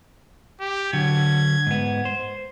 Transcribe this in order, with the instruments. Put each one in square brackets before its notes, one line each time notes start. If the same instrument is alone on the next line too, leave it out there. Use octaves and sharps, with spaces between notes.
[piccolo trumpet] G4
[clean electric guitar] D3 F#3 [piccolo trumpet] G#6
[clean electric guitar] G#2 B3
C5